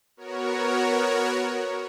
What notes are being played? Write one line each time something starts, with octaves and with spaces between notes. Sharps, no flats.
B3 F#4 A#4 C#5